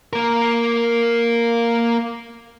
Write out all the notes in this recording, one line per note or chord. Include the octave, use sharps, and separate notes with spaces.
A#3 A#4